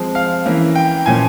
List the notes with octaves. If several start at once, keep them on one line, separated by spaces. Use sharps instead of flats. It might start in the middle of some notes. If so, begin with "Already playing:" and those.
Already playing: F3 G#3 C4
F5
E3 A#3 C#4
G5
A#2 F3 A#3 C#4 G#5